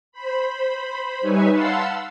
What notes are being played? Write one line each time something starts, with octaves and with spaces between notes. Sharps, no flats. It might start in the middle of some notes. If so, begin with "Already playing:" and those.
C5 B5
G3 D#4 B4 C#5 E5 G#5
F5 F#5 A5 B5 C6 E6